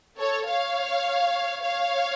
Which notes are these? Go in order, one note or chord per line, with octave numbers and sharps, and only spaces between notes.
A4 C#5
C#5 F5
C#5 F5